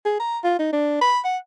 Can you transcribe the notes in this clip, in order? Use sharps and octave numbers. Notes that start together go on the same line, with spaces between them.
G#4
A#5
F4
D#4
D4
B5
F#5